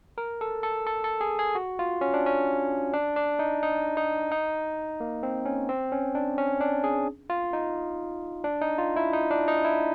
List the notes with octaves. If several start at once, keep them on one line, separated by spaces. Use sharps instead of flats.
A#4
A4
A4
A4
A4
G#4
G#4
F#4
F4
C#4
D4
C#4
D4
D4
D#4
D#4
D#4
D#4
A#3
C4
C#4
C4
C#4
D4
C#4
D4
G#4
F4
D#4
D4
D#4
F4
E4
D#4
D4
D#4
E4